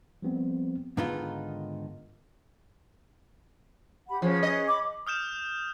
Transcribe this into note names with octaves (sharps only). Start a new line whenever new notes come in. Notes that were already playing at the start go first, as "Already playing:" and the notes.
F3 G3 B3 C4
G#2 D3 D#3 B3 D#4 F4
G4 F#5 B5
F3 C#4 G#4 B4
D#5
B5 D6
D#6 F6 G6 E7